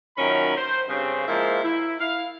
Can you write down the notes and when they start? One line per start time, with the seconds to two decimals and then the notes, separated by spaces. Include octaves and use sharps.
0.17 F#2 A#2 D#3 C#4 A#4 B5
0.57 C5
0.88 G2 C#3 C4
1.28 F3 G#3 A#3 E4 F4 C5
1.63 E4
2.00 E4 F5